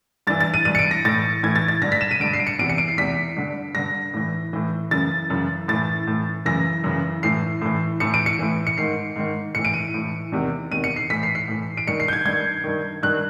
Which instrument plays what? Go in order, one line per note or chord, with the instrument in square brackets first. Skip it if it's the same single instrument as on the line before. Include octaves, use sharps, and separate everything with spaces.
[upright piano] G2 E3 A6
A6
D#7
G2 E3 D#7
C#7
D7
A#6
A2 E3 A6
A2 E3 G#6
A6
A6
G2 D3 A#6
B6
E7
D#7
G2 D3 D7
C7
D7
C#7
E2 C3 E3 D7
C#7
D7
C7
E2 C3 E3 B6
G2 D3
G2 D3 A#6
A2 E3
A2 E3
F#2 C#3 E3 A6
F#2 C#3 E3
A2 E3 A6
A2 E3
F#2 C#3 E3 A#6
F#2 C#3 E3
A2 E3 C7
A2 E3
A2 E3 C#7
D7
C#7
A2 E3
C#7
G#2 D#3 C7
G#2 D#3
A2 C#7
E3
D7
D#7
A2 E3
E2 C3 D#3
E2 C3 D#3 D#7
C#7
C7
A2 E3 B6
C7
C7
A2 E3
D7
G2 D#3 C#7
C7
G6
G#6
G2 D#3 G#6
G2 D#3
G2 D#3 F#6